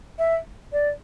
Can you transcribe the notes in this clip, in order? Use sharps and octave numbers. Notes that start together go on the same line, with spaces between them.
E5
D5